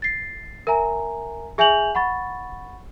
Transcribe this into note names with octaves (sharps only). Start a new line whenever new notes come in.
A6 C7
A#4 E5 G#5 A#5
G#4 E5 G#5 G6 F7 F#7
F#5 B5 C#6 A6